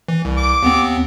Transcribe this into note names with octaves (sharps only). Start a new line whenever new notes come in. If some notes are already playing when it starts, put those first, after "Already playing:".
E3
C2
D6
D#2 B3 C4